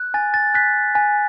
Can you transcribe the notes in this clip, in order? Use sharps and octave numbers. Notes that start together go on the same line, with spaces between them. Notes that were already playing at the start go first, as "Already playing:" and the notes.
Already playing: F#6
G#5 A6
A6
F#6 B6
G#5